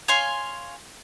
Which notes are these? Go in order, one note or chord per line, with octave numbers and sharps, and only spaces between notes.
C#5 F5 G#5 C6